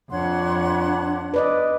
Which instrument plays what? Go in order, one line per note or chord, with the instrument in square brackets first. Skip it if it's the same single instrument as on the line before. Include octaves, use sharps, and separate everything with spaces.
[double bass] F2 [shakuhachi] D4 [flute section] C#5 F#5 C6
[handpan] B4 D5 D#5